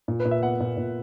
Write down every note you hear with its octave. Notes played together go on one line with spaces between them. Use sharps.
A#2
B4
A#2
E5
B3 F#5
A#2
A#2